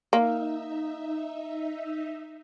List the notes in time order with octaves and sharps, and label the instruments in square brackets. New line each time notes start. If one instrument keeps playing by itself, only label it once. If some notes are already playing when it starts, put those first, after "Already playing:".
[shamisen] A#3 [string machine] D#4 E5